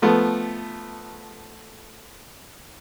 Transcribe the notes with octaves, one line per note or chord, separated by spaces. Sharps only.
F3 A3 B3